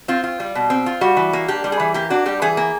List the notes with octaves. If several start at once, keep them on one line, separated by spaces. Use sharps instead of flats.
C4 F4
F4
G3
B2
C4
F4
G3 F#4
E3
A#3
D4 G4
G3
G#4
E3
A#3 G4
D4 F#4
G3 G4
E3 G#4
A#3